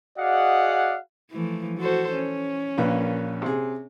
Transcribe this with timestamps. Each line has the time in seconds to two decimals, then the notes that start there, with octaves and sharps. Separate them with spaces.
0.19 F#4 G#4 D5 D#5 F5 F#5
1.31 E3 F3 A3
1.79 F#4 A4 C5
2.14 C#4
2.78 A#1 A#3 B4
3.42 C3 G#4